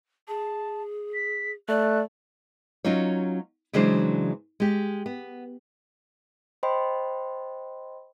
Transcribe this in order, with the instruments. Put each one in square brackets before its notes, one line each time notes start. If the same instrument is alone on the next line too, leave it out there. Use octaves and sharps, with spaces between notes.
[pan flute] G#4 [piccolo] A5
[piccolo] B6
[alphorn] A3 [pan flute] D5 [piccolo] F#6
[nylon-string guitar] F#3 C#4 D#4 F4 C#5
C#3 E3 F#3 G#3 D4 C5
G#3 G4
B3
[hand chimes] C5 D#5 G5 B5 C6